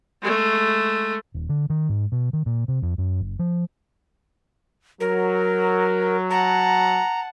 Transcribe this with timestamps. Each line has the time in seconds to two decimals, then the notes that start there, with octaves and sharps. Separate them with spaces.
0.22 G#3 A3
1.35 D#1
1.49 D3
1.70 D#3
1.89 G#2
2.12 B2
2.33 D#3
2.46 A#2
2.68 C3
2.82 F2
2.98 F#2
3.20 F#1
3.39 F3
5.00 F#3 A#4
6.31 F#5 A5 A#5